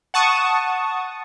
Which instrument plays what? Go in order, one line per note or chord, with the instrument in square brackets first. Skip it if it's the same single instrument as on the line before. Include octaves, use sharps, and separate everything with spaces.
[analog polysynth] F#5 A5 C#6 D#6